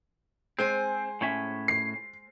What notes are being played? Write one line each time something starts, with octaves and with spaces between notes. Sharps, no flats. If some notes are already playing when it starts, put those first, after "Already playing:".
G#3 C4 C5 G#5
A2 C#4 E5
C7